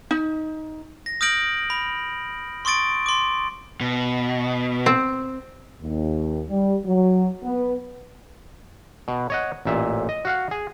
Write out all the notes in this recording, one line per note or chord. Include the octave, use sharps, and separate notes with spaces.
D#4
A#6
D#6 F6 G6 A#6 D7 F#7
B5
C6 C#6 D#6 A6 D7
C6 D6
B2
C4
D#2
G3
F#3
B3
B2
C#5 D#5 F#5
A1 A#2 E5
D#5
F#4 F5 F#5
G#4